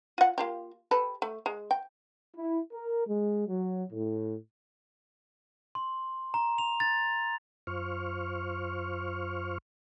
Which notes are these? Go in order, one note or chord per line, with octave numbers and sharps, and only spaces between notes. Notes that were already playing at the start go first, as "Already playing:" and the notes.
F4 F#5
A#3 F4 G4
G4 A4 B4
A3
G#3
G5
E4
A#4
G#3
F#3
A2
C6
A#5
F7
A6
F#2 F4 C5 C#6 F6